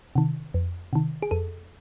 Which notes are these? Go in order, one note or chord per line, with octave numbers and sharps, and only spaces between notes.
C3 D#3
F2
C3 D#3
G#4
F2 A4